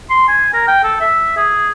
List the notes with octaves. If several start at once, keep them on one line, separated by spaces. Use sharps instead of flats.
C6
G#5
A#4
G5
A4
E5
G#4